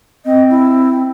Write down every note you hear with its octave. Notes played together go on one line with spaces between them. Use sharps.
C4 D#5
E4